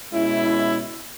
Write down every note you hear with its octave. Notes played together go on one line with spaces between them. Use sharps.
B2 G#3 C#4 E4